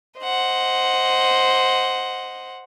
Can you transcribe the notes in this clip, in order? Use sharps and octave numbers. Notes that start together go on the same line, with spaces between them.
C5 D#5 F#5